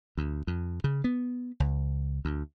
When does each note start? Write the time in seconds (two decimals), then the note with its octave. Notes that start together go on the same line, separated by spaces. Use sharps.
0.17 D2
0.47 F2
0.84 C#3
1.04 B3
1.60 C#2
2.25 D2